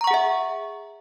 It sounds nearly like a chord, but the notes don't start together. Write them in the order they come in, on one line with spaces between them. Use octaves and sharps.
A#5 C#6 F#5 G#4 E5